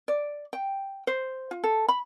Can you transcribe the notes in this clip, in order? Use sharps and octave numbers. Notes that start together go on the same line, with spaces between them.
D5
G5
C5
F4
A4
B5